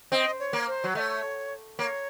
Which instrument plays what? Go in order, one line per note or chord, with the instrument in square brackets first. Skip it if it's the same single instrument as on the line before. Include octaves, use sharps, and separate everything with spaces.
[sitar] C4 [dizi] D#5
[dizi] C#5
[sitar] A#3
[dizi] C5
[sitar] F#3
[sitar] A3 [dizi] D#5
[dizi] C#5
[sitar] A#3 [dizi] C#5